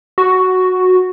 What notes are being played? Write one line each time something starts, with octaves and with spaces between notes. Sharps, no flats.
F#4